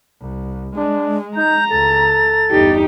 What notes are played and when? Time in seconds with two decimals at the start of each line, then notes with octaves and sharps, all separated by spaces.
0.21 C2
0.77 G#3 D4
1.37 D#4 A#5 G6
1.71 C#2 A4 A6
2.50 G1 E2 D#4 G4